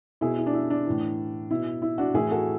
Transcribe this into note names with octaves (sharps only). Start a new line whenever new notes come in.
B2 E4 G#4
E4
D4
E4
D4
A2 E3
B2 E4
E4
D4 F#4
A2 E3 E4 G#4
F#4 A4